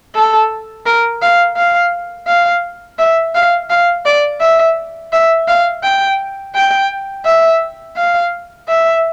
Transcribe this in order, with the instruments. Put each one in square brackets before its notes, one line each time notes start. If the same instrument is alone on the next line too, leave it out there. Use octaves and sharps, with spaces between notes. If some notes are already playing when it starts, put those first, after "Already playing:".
[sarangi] A4
A#4
F5
F5
F5
E5
F5
F5
D5
E5
E5
F5
G5
G5
E5
F5
E5